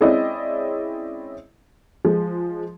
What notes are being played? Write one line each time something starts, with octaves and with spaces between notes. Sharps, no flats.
G#3 C4 C#4 E4 D5 D#5
F3 G#3